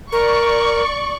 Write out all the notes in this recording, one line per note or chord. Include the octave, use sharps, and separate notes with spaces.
A#4 D5 C#6